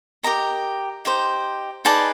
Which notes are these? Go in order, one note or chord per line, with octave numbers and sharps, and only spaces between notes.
G4 A#4 D#5 A#5
D#4 G4 C5
D#4 G#4 B4 D5 A5